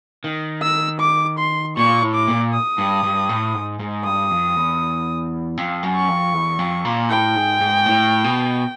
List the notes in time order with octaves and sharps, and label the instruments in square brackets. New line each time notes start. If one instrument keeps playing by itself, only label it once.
[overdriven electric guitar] D#3
[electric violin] E6
D6
C6
[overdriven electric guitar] A#2 [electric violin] C#6
[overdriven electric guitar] A2
[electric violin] D6
[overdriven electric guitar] A#2
[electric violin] D#6
[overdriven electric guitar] G2
G2
A2
G#2
G#2
[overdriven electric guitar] G2 [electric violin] D#6
[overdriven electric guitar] F2
E2
F2
F#2
[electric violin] C#6
[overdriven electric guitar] F2
E2
F2
A#2
[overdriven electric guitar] A2 [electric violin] G5
[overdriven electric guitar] G#2
G#2
A2
B2